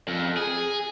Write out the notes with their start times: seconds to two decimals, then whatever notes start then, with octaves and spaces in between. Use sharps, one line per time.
0.08 F2
0.37 G#4